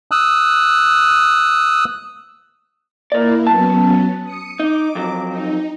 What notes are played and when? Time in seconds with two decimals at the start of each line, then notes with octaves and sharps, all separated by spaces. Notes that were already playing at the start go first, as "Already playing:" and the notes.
0.11 D#6 E6 F#6
3.12 A#3 E4 A#4 D5
3.47 F#3 B3 C#4 A5
4.23 D#6 C#7
4.60 D#4 D6
4.95 F2 F#3
5.29 D#4